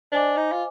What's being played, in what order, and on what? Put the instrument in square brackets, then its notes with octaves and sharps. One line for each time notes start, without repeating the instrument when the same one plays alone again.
[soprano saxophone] D4 [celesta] C5 D#5 G#5 D6
[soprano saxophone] D#4
F4